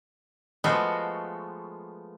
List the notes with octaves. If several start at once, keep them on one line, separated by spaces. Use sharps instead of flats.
F3 G#3 A3 B3 F4 F#4